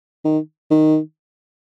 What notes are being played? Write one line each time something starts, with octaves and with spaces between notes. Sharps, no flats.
D#3
D#3